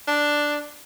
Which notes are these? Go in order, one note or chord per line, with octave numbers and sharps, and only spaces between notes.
D4